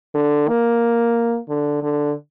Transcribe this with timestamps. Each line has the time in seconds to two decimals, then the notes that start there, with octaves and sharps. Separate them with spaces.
0.15 D3
0.48 A#3
1.49 D3
1.83 D3